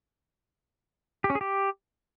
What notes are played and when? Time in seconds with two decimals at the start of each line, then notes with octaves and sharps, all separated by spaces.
1.24 G4
1.30 C#4
1.35 G#4
1.41 G4